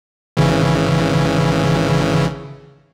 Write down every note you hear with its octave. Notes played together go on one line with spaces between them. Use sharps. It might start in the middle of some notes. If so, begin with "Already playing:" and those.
G#1 C#3 E3